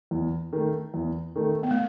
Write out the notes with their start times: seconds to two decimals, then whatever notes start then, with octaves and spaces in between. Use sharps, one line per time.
0.11 E2
0.53 D#3 A3
0.94 E2
1.36 D#3 A3
1.63 B3
1.71 A3